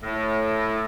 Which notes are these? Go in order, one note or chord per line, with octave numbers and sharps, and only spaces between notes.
A2